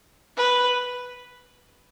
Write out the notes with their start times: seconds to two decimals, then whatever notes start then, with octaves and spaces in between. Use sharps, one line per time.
0.37 B4